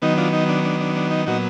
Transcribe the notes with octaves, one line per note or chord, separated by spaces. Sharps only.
D#3 F#3 B3 D#4
D4 F4
D#4
D4
D4
D4
D4
D#4
A#2 F#3 B3 D#4 F#4